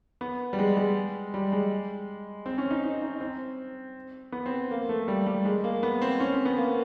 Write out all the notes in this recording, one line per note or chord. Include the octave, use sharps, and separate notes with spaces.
B3
G3
G#3
G#3
G3
G#3
C4
C#4
D#4
D#4
D#4
C4
B3
C4
A#3
A3
G3
G3
G#3
A#3
B3
C4
C#4
C4
B3
A#3